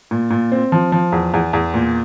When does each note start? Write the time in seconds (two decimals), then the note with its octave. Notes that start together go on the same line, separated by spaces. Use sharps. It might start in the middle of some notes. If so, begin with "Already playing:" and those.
0.11 A#2
0.31 A#2
0.52 C4
0.72 F3
0.92 F3
1.12 E2
1.34 E2
1.53 E2
1.74 A#2